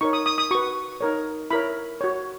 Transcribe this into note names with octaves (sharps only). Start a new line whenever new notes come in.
D#4 A#4 C#5 C#6
D#6
D#6
D#6
F#4 B4 C#6
D#4 A#4 C#5
E4 A#4 C#5 B5
F#4 C#5